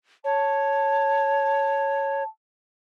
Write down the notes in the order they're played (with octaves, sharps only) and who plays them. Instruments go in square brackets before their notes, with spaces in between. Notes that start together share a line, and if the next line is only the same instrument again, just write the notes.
[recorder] C#5 [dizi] A5